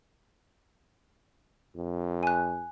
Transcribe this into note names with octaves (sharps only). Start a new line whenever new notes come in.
F2
G#5 F#6